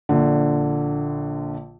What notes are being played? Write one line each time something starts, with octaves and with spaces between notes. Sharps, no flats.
A#1 D3